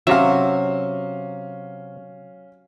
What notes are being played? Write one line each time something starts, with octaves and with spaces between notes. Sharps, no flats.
C3 F#3 C#4 E5 F5